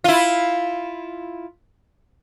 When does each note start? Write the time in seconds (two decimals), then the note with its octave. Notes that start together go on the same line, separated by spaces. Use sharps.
0.04 E4 F4